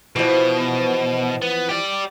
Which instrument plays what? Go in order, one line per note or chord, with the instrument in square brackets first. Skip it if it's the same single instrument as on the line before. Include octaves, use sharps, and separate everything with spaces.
[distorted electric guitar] B2 [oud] E3 F3
[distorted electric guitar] B3
G4 D5